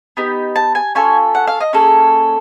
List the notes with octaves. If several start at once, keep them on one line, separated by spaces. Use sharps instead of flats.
B3 D#4 G4
A5
G#5
C#4 F4 A4 G#5
F#5
F5
D#5
A#3 C#4 G#4 A4